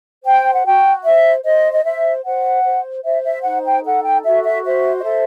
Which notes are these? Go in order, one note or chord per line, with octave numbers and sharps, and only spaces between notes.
C5 G5
F#5
F#4 G5
C5 E5
C5 D#5
D#5
C5 E5
C5 F#5
C5
C5 E5
E5
D#4 F#5
G5
A4 F#5
G5
F#4 E5
E5
C5 E5
D#5
A4 E5